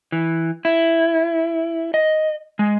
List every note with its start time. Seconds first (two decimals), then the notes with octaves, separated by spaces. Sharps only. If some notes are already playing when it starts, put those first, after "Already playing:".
0.12 E3
0.65 E4
1.94 D#5
2.59 G#3